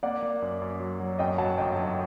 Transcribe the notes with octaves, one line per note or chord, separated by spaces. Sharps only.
A#3 D5 F#5
A#3
F#2
F#2
F#3
F#3
F#2 D#5 G5
F#3 F#5 A5
G1 D#5 G5
F#3